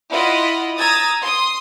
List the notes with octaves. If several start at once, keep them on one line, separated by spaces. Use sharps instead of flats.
E4 F4 D#5 F#5 B5
A#5 D#6 E6 G#6 A6
C6 D#6